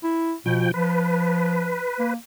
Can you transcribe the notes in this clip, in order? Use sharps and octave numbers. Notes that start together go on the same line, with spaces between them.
E4
B2 F3 G5
F3 B4
A#3